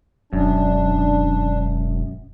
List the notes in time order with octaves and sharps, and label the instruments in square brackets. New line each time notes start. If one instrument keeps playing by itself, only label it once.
[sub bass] E1 [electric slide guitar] F#2 [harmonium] D4